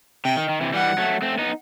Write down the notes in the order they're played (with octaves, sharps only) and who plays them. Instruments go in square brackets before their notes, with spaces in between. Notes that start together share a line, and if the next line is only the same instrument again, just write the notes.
[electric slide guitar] C3 [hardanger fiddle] G5
[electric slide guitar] D#3
D#3
C3 E3
[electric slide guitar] E3 G3 [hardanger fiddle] F#5
[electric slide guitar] F#3 A3
A3 C4
B3 D#4